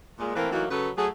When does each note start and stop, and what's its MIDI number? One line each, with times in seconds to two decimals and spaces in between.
0.19 0.32 46
0.19 0.32 56
0.35 0.48 52
0.35 0.48 57
0.35 0.48 58
0.35 0.48 60
0.35 0.48 70
0.35 0.48 71
0.52 0.65 52
0.52 0.65 54
0.52 0.65 57
0.52 0.65 58
0.52 0.65 63
0.52 0.65 66
0.71 0.89 49
0.71 0.89 54
0.71 0.89 69
0.71 0.89 71
0.97 1.07 54
0.97 1.07 57
0.97 1.07 66
0.97 1.07 68